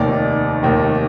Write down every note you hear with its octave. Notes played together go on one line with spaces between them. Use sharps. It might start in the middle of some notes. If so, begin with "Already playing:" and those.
Already playing: F1 D#2 D#3 D5
F1 D#2 D#3